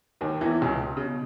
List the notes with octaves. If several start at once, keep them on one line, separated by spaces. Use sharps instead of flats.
D#2 D#3
E2 E3
C#2 C#3
C#3
B2